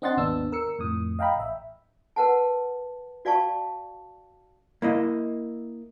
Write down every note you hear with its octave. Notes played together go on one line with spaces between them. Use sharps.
C4 D4 D#5 F#5 C6 A6
G#1 D#2 B3 D4 E6
A#4 E6 C#7
F2 A2 D#6
D#5 F5 G5 A#5 B5
A1 E5
A#4 B4 F#5 A5
F#4 D5 F5 G5 A5 C#6
A#3 E4 D#5